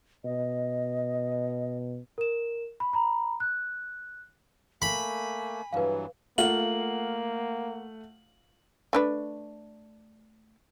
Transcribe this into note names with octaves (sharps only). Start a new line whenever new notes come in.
B2 D#5
A#4 E7
B5
A#5 B5
F#6
A3 A#3 G#5 B5
G2 E3 F#3 B4 F5
A3 A#3 F4 F#5 F#7
A3 D4 B4